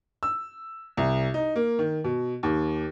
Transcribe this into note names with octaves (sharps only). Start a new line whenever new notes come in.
E6
C2
D#4
A#3
D#3
B2
D#2